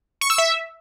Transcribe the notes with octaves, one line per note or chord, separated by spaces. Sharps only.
C#6
E6
E5